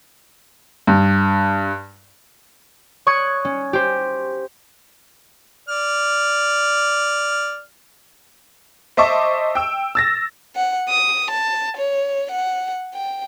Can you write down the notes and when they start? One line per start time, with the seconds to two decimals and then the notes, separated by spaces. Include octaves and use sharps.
0.87 G2
3.06 C#5 C#6 D#6 F#6 G#6
3.45 C#4
3.73 G4 C5
5.69 D5 F6
8.97 C5 D#5 E5 A5 C#6 D6
9.55 G5 E6
9.95 E6 A6 A#6
10.56 F#5
10.89 D#6
11.31 A5
11.77 C#5
12.31 F#5
12.94 G5